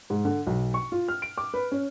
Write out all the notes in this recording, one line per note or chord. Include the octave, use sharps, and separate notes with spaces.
G#2
D3
B1
C#6
F4
F6
D7
D6
B4
C#4